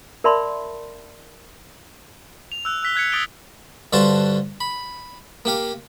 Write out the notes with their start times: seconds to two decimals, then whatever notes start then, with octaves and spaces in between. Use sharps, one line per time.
0.24 A#4 D5 E5 A5 B5 C6
2.52 F7
2.65 E6 F#6
2.82 E6 F#6 B6 G7
2.96 F#6 G#6 B6 C#7
3.12 D#6 A6 D7 F7 G7
3.93 G2 D3 F#4 C5 A5 C6
4.61 B5
5.45 A#3 G4 F5